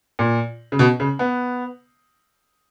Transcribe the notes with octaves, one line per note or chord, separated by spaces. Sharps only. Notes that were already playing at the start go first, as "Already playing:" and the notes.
A#2
C#3
B2
C#3
B3